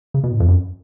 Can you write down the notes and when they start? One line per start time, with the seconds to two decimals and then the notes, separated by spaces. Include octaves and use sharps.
0.14 C#3
0.24 B2
0.32 A2
0.40 F2
0.48 F#2